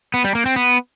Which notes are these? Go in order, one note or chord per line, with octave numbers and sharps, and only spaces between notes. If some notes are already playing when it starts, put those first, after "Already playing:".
B3
G3
A#3
C4
B3